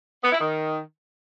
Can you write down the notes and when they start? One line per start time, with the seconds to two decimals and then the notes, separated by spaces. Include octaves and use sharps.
0.24 B3
0.32 E4
0.40 D#3